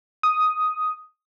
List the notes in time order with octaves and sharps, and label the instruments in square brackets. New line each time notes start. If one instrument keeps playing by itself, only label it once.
[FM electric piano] D#6